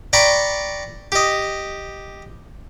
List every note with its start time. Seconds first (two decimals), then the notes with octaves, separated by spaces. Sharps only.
0.13 D5 G5 A#5 B5 C#6
1.12 G4 D#5